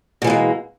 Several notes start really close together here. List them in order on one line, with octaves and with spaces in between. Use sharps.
B2 E3 A#3 G#3